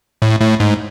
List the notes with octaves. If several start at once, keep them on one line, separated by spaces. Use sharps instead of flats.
A2
A2
G#2